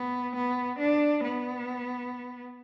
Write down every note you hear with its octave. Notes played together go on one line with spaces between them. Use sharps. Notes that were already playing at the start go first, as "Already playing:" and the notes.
Already playing: B3
B3
D4
B3